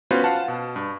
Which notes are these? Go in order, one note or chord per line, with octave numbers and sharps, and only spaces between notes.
B3 C#4 F4 F#4 B4 C5
F5 F#5 A5
B2
G2